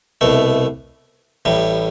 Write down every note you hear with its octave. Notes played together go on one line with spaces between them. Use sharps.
C2 B2 A3
A1 A2 G3